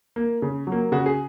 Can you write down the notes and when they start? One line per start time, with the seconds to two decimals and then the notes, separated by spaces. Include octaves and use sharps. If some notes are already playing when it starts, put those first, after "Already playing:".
0.16 A#3
0.42 C#3
0.67 F#3
0.72 A#3
0.92 C#3 F#4
1.06 G#4